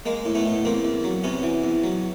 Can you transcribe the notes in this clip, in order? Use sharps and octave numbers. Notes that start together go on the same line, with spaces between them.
G#3 A#3
A2
A3 B3
A2
E2 A#3 C4
E2
F#3
C3 B3 C#4
E3
E2
F#3